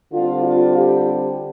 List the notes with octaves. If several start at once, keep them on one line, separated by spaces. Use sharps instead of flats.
D3 G3 C4 F4
F4
G4